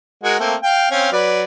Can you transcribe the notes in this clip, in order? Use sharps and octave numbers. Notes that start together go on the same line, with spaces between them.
G#3 F#4 A#4
A3 A#3 C4
F5 G5
C4 C#4 F5
F#3 B4 D5